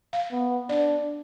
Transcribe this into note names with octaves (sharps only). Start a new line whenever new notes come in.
F5
B3
D4 D5